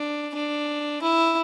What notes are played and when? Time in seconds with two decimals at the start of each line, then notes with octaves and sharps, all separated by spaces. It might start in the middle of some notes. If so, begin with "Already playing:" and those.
Already playing: D4
0.34 D4
1.02 E4